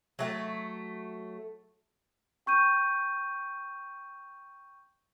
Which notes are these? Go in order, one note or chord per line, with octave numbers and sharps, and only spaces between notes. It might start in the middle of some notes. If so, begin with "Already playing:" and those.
F#3 A3 F#5 A5
G5 C#6 G6 D#7